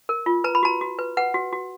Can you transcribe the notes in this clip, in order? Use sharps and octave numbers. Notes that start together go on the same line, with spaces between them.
A#4
F4
B4 A#5
B5
F#4 A#5
F#4
B4
B4 F#5
F#4
F#4